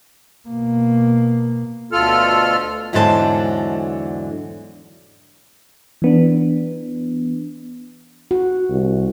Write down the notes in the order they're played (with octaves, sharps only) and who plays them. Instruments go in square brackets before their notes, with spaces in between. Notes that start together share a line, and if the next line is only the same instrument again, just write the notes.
[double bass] B2 A#3
[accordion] D2 B2 F4 A4 F6
[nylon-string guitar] E2 G#2 D3 F#3 C5 A5
[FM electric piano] E3 B3 D4
[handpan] F#4
[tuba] C2